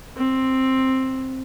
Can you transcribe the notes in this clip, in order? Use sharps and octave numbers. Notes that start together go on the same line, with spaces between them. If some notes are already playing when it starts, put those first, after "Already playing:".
C4